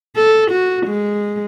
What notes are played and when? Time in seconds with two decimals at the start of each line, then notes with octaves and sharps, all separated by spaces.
0.16 A4
0.51 F#4
0.86 G#3